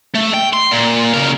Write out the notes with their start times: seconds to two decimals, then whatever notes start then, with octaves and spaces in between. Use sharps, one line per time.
0.14 A3
0.34 G5
0.53 C6
0.71 A#2
1.14 C#3 A#4